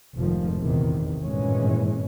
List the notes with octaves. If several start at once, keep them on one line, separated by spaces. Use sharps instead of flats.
F1 G#2 C3 D#3 F3
A#1 E2 C3 D#3
G#1 G2 A#2 E3 G#3 C#4